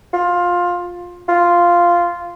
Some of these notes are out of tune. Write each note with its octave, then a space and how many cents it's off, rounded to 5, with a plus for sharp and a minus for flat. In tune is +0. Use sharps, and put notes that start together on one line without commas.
F4 +15
F4 -5